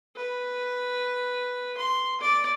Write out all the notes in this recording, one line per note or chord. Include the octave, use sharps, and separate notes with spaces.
B4
C6
D5